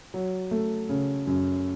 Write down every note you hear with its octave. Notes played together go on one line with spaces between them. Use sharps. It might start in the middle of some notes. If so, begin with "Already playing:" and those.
F#3
A3
C#3
F#2